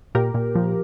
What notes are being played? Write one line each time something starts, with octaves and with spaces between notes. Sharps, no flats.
A#2 G4 A#4
A#2
F3